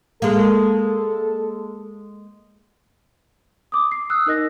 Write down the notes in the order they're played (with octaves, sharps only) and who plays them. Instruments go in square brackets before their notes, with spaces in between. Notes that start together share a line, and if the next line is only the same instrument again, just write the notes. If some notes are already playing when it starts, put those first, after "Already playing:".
[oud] G#3 A#3 [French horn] A4
[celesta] D6 D#6
C7
D#6 E6 F#6
D#4 A#4 D#5 A#6